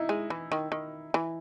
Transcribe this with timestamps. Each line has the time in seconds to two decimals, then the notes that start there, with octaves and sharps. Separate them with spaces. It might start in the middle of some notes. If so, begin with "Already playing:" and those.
Already playing: D#4 E4
0.09 G#3
0.30 E3
0.52 D#3
0.72 D#3
1.14 E3